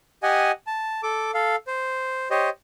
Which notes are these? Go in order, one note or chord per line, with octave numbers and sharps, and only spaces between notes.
G4 D#5 F#5 G#5
A5
A4 D6
A4 F5
C5
G4 C5 C#5 D#5